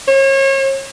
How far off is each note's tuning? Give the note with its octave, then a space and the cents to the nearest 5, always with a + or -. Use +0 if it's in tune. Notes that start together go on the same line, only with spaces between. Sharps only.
C#5 -35